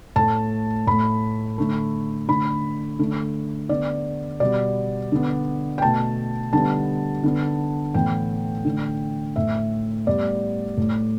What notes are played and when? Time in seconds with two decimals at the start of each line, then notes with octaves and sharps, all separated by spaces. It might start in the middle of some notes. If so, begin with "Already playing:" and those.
0.16 A2 A3 A5
0.87 A2 A3 B5
1.58 D3 A3
2.28 D3 A3 B5
2.99 D3 A3
3.69 D3 B3 D5
4.40 B2 G3 B3 D5
5.12 D3 B3
5.78 G5
5.82 B2 A3 A5
6.53 D3 G3 B3 A5
7.24 D3 B3
7.94 A2 E3 B3 G5
8.65 D3 A3
9.36 A2 A3 E5
10.06 A2 G3 B3 D5
10.77 A2 A3